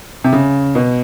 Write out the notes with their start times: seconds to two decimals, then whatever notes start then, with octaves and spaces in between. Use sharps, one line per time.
0.24 C3
0.33 C#3
0.75 B2